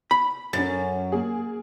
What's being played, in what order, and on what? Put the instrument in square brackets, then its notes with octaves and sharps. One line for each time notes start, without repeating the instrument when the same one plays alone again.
[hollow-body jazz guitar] B5
[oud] F#2 [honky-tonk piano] C#4 A6
[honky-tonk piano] A#3 G#4